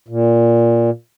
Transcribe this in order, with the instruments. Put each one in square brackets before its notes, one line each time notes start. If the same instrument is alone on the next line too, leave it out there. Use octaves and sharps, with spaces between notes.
[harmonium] A#2